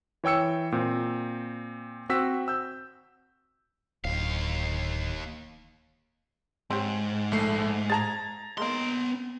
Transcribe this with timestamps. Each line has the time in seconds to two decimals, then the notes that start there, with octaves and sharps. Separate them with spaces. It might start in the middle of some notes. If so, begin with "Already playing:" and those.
0.24 E3 C#5 G5 E6 C#7
0.72 A#2 C4
2.09 C4 F#4 E6 B6
2.48 E6 G6
4.04 D1 D#2 F5
6.70 G#2 C4 G4 C#5
7.32 A#1 A3 C7
7.90 G#4 A5 A#5 G#6 A6
8.58 G#3 A#3 B3 D#4 C6